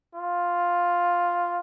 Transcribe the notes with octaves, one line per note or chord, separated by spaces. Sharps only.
F4